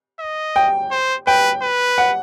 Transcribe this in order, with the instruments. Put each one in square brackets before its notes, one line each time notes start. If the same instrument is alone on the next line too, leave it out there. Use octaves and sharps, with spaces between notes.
[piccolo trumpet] D#5
[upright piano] G5
[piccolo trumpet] C5
[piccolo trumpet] B4 [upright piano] G5
[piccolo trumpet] B4
[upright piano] F#5